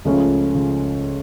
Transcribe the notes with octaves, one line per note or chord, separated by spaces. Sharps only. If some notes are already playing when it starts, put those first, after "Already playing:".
C#2 C#3 F3 A3 C#4
C#3